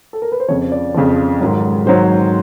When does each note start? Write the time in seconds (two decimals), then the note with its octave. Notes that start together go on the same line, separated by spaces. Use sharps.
0.13 A4
0.22 A#4
0.32 B4
0.40 C5
0.48 F2 C#3 F3 C#5
0.72 D5
0.94 F2 C#3 F3
1.41 G#2 D#3 F#3
1.86 G#2 D#3 F#3 C5